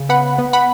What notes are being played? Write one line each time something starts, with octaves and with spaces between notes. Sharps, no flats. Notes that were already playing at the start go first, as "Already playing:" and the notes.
Already playing: C#3
B3 F#5 B5
B3
F#5 B5